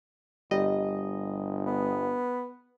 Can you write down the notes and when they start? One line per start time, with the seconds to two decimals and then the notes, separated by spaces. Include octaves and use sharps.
0.51 G1 G3 D#5
1.67 B3